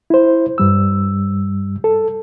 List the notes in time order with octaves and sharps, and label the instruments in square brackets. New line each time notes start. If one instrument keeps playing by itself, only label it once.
[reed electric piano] E4 C5
G2 G3 E6
A4